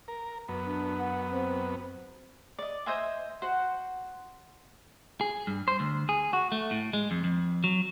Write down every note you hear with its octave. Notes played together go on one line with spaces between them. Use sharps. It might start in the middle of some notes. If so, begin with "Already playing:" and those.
A#4
F#2 B3
D4
F#5
C4
D5 D#5
C5 D#5 E5 G#5
F#4 C5 F#5
G#4
G2
C5
D2
G#4
F#4
A3
A2
G#3
F2
F2
F#3